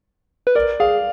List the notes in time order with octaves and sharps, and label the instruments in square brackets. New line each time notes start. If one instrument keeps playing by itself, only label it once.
[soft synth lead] B4
[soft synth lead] A#4 [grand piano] D5
[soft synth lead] G#4 [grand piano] F5